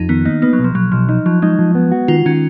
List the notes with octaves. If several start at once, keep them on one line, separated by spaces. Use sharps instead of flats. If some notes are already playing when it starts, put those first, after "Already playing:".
Already playing: F2 D#4
D#3 B3
A#3 D#4
A#3 B3
F#3
B1
F3
B1 F#3
B1 F3
F3 D#4
F3 F#3
G#3 D#4
F3
B3
F#4
D#3 F4
D#3 C#4